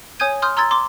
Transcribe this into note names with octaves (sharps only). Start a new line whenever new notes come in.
C#5 G#5 D#6 G6 G#6 D#7
C6 D#6 F6 G6
A#5 C6 E6 G#6 A6
C6 D6